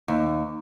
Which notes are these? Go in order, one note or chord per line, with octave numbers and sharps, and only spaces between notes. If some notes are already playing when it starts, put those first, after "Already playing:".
D#2